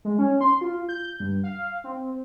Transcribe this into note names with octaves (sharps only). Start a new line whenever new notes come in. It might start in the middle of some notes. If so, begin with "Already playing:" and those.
G#3
C#4
C6
F4
G6
G2
F5
C4